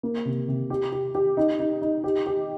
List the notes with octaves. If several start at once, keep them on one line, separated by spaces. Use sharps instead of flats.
A#3
C3
C3
G4
G4
G4
D#4
D#4
D#4
G4
G4